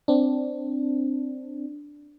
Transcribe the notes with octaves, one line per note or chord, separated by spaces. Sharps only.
C4 D4